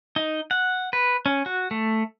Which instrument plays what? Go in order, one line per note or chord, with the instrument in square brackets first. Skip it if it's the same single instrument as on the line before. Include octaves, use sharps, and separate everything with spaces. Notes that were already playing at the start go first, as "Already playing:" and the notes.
[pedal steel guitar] D#4
F#5
B4
C#4
F#4
A3